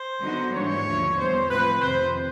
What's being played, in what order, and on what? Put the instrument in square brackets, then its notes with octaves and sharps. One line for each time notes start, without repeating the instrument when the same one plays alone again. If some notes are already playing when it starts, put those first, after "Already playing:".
Already playing: [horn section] C5
[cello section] D3 F#3 B3 D#4 F#4
[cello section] G#2 E3 G3 A#3 D4 [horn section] C#5
[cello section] D#2 D3 F3 A3
[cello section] E2 B2 G3 B3 [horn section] C5
[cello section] A2 F3 G#3 C4 [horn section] B4
[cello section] F2 C3 D#3 [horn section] C5